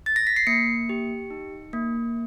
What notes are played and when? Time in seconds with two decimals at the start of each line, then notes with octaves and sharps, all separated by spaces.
0.06 A6
0.16 A#6
0.27 B6
0.36 C7
0.47 A#3 C#7
0.89 G4
1.30 D#4
1.73 A#3